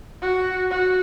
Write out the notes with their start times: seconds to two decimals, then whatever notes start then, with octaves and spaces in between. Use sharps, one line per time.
0.22 F#4
0.71 F#4